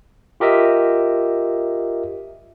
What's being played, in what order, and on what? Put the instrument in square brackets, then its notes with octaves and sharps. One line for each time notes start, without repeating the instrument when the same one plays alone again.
[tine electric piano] F4 G4 A#4 D#5 E5